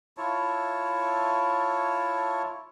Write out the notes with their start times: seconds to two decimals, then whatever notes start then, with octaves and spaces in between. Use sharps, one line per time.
0.17 E4 F4 C#5 A5